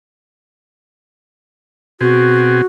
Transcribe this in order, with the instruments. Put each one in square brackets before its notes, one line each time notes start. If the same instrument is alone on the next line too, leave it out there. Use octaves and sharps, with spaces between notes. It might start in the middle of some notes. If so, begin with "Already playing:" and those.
[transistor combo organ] B2 C4 G#4 [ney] F#4